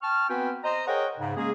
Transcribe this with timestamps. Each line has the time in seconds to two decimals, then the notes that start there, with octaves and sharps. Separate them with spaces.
0.02 G5 A5 C#6 F6
0.29 B3 C4 F#4 B4 G5 G#5
0.64 C5 D#5 A#5
0.87 G#4 A#4 C#5 D#5 F#5 G5
1.18 G#2 C#3
1.37 G#3 A#3 C#4 G#4